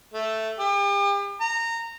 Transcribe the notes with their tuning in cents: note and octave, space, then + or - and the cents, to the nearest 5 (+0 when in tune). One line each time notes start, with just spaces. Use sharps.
A3 +0
G4 +40
A#5 -20